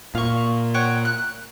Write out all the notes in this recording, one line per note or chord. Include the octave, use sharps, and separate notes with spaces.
A#2 F5 C#6
C#5 F#5 G5
F#6